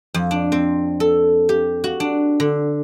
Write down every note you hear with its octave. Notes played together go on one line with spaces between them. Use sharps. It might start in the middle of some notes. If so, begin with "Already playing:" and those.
F2
D4
C4
A4
G4
F#4
D4
D3